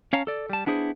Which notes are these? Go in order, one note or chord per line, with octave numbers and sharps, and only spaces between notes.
C#4 C#5 F5 A5 A#5
A4 D5
G3 A5
B3 D4 E4 G#4 C5